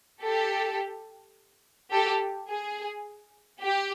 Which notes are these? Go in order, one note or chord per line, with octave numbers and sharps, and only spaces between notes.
G4 A4
G4 A4
G#4
G4